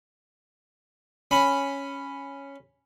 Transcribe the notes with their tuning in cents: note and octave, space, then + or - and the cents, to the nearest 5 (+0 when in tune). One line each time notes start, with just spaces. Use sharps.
C#4 +0 B5 +0